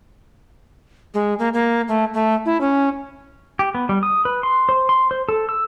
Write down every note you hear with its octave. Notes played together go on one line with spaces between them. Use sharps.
G#3
A#3
A#3
A3
A3
E4
C#4
G4
B3
G3
D#6
B4
C6
C5
C6
C5
A4
E6